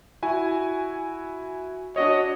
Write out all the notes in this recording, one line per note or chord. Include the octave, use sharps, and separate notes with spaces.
E4 F#4 G#5
D4 F#4 C#5 D#5